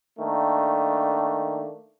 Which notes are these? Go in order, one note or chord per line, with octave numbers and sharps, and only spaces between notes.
D#3 A3 A#3 D4